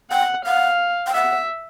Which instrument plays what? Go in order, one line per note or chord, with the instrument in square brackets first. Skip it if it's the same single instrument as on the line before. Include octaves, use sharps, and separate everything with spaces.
[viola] F#5 [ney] G5
[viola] F5 [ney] F#5
[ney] G5
[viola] E5 [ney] F#5